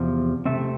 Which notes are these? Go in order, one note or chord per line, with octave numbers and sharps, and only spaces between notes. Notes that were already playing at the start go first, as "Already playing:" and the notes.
Already playing: E2 C3 F3
C3 F3 A3 C4 E5